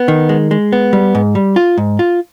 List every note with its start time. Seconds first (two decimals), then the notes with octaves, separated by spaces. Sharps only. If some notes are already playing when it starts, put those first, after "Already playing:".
Already playing: B3
0.08 D#3
0.29 G#3
0.51 G#3
0.72 B3
0.93 G3
1.15 G#2
1.35 G3
1.56 F4
1.78 G#2
1.99 F4